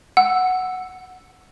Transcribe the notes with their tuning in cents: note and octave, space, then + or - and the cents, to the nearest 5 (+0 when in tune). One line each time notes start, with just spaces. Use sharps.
F#5 +0 E6 +0